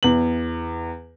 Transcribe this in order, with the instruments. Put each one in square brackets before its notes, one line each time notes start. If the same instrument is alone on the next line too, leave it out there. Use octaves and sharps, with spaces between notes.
[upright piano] E2 F#7